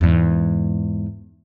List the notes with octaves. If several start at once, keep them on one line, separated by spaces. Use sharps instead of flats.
E2 G#2